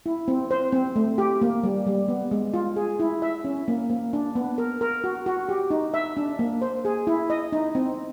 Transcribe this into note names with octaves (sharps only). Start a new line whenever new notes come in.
E4
C4
C5
C4
A3
G4
A#3
G3
G3
B3
G#3
F4
G#4
E4
E5
C#4
A#3
A#3
D4
B3
A#4
A#4
F#4
F#4
G4
D#4
E5
D4
A#3
C5
G#4
E4
D#5
D#4
C4